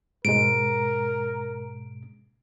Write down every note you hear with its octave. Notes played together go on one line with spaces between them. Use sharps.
G#2 B2 G#3 A#4 D7